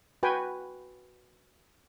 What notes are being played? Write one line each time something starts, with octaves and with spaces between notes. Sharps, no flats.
F#4 B4 G5 G#5